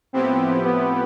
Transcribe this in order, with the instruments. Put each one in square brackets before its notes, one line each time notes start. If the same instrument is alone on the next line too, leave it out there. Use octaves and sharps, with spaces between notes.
[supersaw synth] A2 F3 B3 E4 G4 [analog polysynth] C4
[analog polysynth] B3